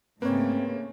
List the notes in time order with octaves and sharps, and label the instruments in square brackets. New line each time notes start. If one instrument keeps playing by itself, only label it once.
[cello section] G#2 C#3 A3 [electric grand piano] A#3 [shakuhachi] C4 [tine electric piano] B4 C#5